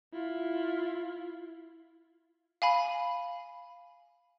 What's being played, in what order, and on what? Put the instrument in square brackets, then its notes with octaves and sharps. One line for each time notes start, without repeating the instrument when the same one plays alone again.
[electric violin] E4 F4
[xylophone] F5 G#5 B5